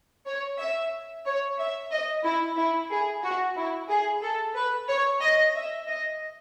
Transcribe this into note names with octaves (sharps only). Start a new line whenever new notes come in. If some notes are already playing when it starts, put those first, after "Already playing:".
C#5
E5
C#5
E5
D#5
E4
E4
G#4
F#4
E4
G#4
A4
B4
C#5
D#5
E5
D#5